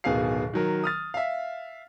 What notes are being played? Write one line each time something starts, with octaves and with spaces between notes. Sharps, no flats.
D1 B2 D#3 G#4 F5 C7
D#3 F#3 A#4
D#6 F6 A6
E5 F5